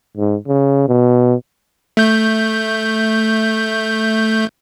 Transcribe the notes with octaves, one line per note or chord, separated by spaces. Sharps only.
G#2
C#3
B2
A3 G6